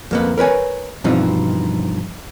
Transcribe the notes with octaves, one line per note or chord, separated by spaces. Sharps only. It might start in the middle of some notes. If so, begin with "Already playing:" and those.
F2 A#3 B3
A#4 B4 C#5 G#5
G2 B2 E3 F3 C4 D#4